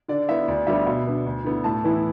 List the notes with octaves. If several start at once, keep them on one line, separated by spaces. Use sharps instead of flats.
D3 D5
B3 E4 E5
D2 D5
D3 G3 B3 E5
B2 E5
B3 D4
D2
D3 B3 E4
A2 A5
E3 B3 E4